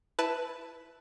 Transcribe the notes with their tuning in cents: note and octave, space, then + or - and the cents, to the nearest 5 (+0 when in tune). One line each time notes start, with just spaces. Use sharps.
E4 +0 B4 +5 A5 +0